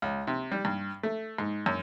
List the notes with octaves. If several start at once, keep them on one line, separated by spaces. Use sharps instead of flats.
C#2
C3
G3
G2
A3
G#2
F#2